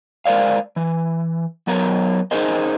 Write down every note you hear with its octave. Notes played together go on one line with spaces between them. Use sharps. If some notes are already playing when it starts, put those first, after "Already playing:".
G#3 A#4 C5 D5 F5
E3
F#3 B3 A#4 C#5 A#5
C#4 D#4 G#4 A#4 C5 D#5